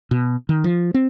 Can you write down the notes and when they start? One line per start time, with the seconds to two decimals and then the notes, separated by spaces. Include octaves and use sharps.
0.11 B2
0.49 D#3
0.64 F3
0.94 C4